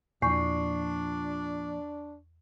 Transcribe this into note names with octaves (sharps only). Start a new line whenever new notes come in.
E2 A#2 F3 D4 C#6 C7